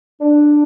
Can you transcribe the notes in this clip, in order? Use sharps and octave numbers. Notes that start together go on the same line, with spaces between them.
D4